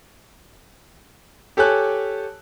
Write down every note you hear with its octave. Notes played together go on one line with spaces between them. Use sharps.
G4 A4 C#5 G#5 F#6